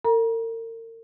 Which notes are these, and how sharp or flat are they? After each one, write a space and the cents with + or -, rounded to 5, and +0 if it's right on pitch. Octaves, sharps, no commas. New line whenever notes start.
A#4 -40 A#5 +35